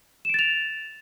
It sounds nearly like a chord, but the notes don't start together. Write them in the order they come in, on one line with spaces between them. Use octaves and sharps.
E7 D7 A6 F7